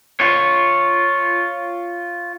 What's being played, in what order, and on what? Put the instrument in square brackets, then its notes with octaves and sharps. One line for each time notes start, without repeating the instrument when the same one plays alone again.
[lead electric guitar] F4 C#5